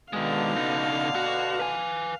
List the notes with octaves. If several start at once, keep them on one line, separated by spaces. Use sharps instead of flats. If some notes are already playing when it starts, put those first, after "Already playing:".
B2 D3 D#3 G#3 F5
C#3 D#4
F#4
B4 G#5